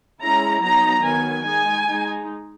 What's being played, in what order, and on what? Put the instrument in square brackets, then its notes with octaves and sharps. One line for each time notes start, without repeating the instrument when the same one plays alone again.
[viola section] G#3 C#4 E4 A#5
F#3 B3 D#4 A#5
D#3 F#3 B3 G#5
G#3 D#4 G#5
G#3 D#4